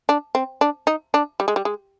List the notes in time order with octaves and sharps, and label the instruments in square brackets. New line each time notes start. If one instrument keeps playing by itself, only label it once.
[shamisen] D4
C4
D4
D#4
D4
G3
G#3
G3
G#3